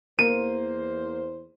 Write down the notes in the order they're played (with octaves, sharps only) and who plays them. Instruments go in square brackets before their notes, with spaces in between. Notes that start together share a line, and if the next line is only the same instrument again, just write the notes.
[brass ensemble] E2 C5 [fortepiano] A#3 [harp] D#7